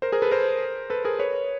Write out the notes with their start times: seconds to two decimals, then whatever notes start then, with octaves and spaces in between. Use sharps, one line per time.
0.02 A#4 C5
0.12 G#4 A#4
0.22 A4 B4
0.31 A#4 C5
0.90 A4 B4
1.04 G#4 A#4
1.19 B4 C#5